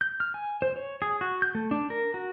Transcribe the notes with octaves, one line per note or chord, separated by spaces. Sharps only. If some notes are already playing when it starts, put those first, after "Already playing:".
G6
F6
G#5
C5
C#5
G#4
F#4
G6
A3
D4
A#4
F#4